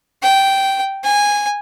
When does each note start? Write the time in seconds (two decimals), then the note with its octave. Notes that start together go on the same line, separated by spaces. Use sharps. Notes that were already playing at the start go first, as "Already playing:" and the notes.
0.22 G5
1.04 G#5